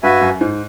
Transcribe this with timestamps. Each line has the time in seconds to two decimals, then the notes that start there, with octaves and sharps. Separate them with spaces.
0.03 G2 F#4 B4 E5 G#5
0.21 F#2
0.41 G#2